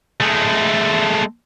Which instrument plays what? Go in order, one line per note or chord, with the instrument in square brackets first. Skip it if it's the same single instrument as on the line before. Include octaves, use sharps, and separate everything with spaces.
[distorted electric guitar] G#3 A3